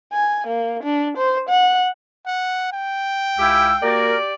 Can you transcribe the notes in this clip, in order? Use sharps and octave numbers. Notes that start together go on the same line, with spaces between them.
G#5
A#3
D4
C5
F#5
F#5
G5
C#2 E4 G4 F5 G#5 E6
A#3 F#4 G4 A#4 D5